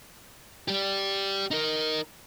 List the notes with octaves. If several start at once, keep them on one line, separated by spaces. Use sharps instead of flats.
G4 D5
D#4 A#4